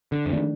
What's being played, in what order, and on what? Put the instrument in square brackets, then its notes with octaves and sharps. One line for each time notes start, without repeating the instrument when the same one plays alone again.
[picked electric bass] D3
F2
[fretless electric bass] D#3 A3 D4